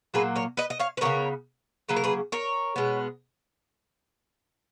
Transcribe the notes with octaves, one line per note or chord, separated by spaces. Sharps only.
A#2 F#3 A#3 G#4 B4
A#4 C#5
B4 D#5
D#5
C#5 F5
B4
C#3 F#3 B3 A#4 C#5
C#3 F#3 A#3 B4
A#4
G#4 B4
A#4 C#5
B2 G#3 B3